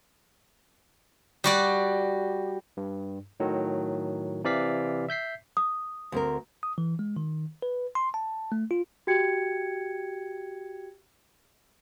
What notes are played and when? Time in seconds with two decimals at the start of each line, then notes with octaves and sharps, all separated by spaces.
1.44 G3 F#4 D5
2.77 G2
3.40 A2 D#3 F#3
4.44 C3 E3 D5 F5 B6
5.09 E5 G6 B6 C7
5.57 D#6
6.12 D2 C4 A#4
6.63 D#6
6.78 E3
6.99 G#3
7.17 D#3
7.62 B4
7.95 C6
8.14 A5
8.52 A3
8.71 F4
9.07 F#4 G4 G5 G#6 C#7